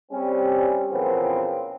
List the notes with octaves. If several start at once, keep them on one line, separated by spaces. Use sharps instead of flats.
G3 C4 C#4
A#2 C#3 E3 F3 B3 C4